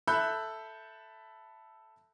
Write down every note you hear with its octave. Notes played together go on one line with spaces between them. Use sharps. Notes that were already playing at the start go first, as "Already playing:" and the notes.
A4 E5 B5 F#6 G6